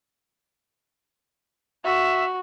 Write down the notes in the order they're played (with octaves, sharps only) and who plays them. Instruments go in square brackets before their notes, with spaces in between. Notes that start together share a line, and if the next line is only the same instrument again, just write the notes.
[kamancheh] F#4 [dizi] E5